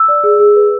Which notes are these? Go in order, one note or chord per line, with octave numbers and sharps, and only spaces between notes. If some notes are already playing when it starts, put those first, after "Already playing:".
Already playing: E6
D5
G#4
G#4
B4